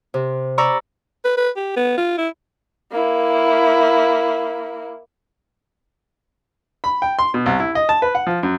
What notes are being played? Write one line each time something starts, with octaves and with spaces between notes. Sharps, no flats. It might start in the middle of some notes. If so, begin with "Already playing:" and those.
C3
D5 A#5 B5 C#6 E6
B4
B4
G4
B3
F4
E4
A#3 E4
B5
G5
C6
B2
C2
E4
D#5
A5
B4
F#5
F3
F#2